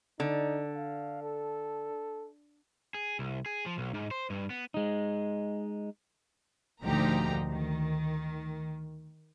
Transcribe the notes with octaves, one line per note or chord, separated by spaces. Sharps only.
D3 D#4
F5
A4
G#4
C2
G#4
F3
B1
G#2
C5
G2
B3
G#3 D#4
D2 A#2 F3 D#4 G4 A#5
D#3